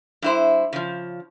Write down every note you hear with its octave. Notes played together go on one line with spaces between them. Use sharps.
G2 E4 C5
C#3 F3